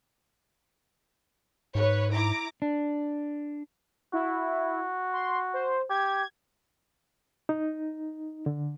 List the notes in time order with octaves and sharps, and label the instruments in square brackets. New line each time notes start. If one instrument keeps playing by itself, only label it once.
[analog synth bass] G#2 [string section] B4 C#5
[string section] E4 A#5 D6
[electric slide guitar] D4
[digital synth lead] E4 [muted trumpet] F#4
[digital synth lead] C6
C5
[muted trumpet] G4 [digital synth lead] G#6
[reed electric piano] D#4
D3